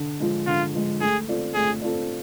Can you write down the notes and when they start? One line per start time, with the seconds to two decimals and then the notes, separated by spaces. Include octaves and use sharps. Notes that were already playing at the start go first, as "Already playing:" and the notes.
Already playing: D3
0.20 F3 G#3
0.47 D3 F4
0.74 F3 G#3
1.01 A3 G#4
1.28 C4 F4 A4 D5
1.54 A3 G#4
1.82 C4 F4 A4 D5